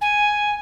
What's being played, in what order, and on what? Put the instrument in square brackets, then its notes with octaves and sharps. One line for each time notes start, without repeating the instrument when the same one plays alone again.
[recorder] G#5